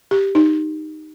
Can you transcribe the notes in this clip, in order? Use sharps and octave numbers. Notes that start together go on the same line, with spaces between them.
G4
D#4